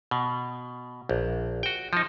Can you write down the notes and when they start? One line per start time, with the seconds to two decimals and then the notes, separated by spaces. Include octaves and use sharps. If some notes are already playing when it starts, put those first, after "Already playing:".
0.11 B2
1.09 A#1
1.63 F#4 G5
1.93 F3 D#4